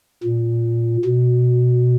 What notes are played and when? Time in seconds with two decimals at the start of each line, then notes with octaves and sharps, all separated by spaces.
0.23 A#2
1.05 B2